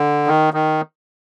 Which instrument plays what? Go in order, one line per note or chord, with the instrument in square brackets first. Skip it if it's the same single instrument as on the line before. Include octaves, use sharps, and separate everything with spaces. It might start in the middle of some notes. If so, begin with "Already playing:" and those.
Already playing: [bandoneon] D3
D#3
D#3